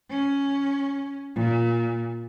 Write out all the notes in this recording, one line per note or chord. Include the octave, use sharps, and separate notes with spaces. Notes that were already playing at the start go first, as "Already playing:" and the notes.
C#4
A#2